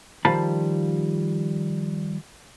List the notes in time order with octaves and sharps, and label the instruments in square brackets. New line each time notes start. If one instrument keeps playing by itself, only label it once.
[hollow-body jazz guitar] D#3 F3 G3 F4 A5 B5